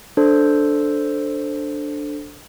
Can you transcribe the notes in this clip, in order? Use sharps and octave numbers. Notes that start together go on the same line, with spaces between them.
D4 A4 C5